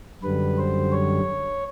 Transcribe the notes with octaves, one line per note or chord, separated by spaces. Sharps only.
F#2 D3 G3 B4
C5
C#5